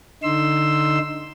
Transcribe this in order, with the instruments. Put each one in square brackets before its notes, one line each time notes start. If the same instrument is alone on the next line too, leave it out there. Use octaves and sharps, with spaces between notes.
[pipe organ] D3 D#4 C6 E6